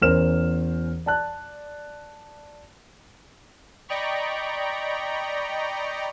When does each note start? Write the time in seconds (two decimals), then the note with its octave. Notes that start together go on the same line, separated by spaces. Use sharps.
0.02 E2 C#4 A#4 C5 F6 E7
1.06 D5 A5 F#6
3.89 D5 D#5 G5 A#5 B5 C#6